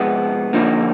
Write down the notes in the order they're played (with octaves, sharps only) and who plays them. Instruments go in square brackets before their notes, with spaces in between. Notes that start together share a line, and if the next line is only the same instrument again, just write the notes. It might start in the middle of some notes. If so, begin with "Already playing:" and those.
Already playing: [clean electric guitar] C3 F3 G#3 B3
F2 D3 F3 A#3 D#4